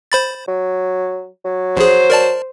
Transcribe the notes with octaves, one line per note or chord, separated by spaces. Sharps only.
C5 B5 A6
F#3
F#3
A#1 G#4 C5
A#4 D5 A5